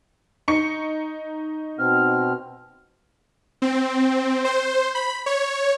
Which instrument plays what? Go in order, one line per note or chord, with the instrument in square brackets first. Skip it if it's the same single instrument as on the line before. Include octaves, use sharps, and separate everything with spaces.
[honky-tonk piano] D#4 C#6 C#7
[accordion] B2 C4 F6
[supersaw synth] C4
C5
B5
C#5